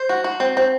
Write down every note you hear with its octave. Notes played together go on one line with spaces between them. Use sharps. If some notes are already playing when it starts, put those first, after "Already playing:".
Already playing: C5
F#4
F#4
C4
C4